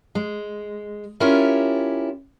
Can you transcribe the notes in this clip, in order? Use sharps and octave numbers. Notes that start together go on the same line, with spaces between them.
G#3
C#4 E4 F4 G4 A#4 C#5